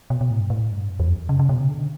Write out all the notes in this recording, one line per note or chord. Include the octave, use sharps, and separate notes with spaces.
B2
B2
A2
G2
A2
G2
F#2
E2
F#2
C#3
C#3
B2
C#3
D3